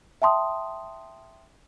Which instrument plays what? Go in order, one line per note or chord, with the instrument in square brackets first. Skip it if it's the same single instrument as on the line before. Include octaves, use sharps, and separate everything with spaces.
[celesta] E5 G5 A5 C6 D#6